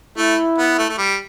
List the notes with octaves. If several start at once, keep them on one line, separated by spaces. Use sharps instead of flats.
A3 E4
B3
A3
A3
G3